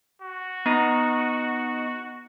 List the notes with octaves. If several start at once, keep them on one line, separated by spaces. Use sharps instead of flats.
F#4
B3 D#4